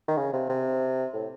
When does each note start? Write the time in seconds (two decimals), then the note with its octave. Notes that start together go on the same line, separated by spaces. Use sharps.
0.08 D#3
0.17 C#3
0.33 C3
0.49 C3
1.13 A2